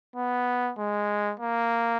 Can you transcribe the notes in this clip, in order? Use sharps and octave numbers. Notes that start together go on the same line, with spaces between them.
B3
G#3
A#3